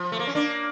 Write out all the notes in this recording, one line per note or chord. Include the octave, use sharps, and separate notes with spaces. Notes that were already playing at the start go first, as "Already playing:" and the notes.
Already playing: F3
A3
A#3
C#4
A#3 D4